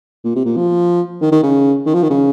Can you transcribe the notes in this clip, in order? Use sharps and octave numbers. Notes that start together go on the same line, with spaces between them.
A#2
C3
A#2
F3
D#3
D#3
C#3
D#3
F3
D#3
C#3